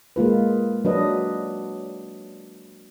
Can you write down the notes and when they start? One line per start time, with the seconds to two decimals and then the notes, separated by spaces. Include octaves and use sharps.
0.16 G#3 A#3 F4 B4
0.85 F#3 D4 B4 D#5